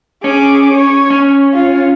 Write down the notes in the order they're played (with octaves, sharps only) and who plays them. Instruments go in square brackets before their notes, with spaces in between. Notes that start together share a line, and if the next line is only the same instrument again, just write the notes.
[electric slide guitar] C#4 [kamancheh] G#4 D6
[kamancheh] C#5
[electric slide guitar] C#4
[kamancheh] F4